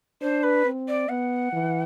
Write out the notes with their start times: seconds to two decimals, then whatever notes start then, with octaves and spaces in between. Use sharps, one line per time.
0.21 D4 C5
0.43 B4
0.65 C4
0.88 D5
1.09 B3 F#5
1.53 E3